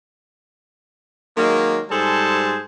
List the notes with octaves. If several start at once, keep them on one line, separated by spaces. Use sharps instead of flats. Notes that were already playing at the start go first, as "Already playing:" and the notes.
D#3 F#3 G#3 A#3
G#2 G3 G#4 A4 C5 A5